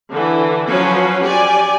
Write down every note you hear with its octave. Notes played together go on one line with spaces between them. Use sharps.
D3 E3
F3 F#3 C#4 F#4 B4
G4 D5 G#5